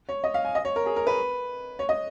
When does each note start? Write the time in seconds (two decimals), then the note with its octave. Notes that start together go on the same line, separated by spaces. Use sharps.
0.09 C#5
0.24 D#5
0.34 F5
0.45 G#5
0.55 D#5
0.65 C#5
0.76 A#4
0.86 G#4
0.96 A#4
1.07 B4
1.79 C#5
1.89 D#5